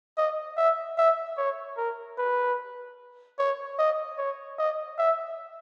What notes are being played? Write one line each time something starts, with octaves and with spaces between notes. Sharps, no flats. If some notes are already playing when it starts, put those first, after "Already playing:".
D#5
E5
E5
C#5
A#4
B4
C#5
D#5
C#5
D#5
E5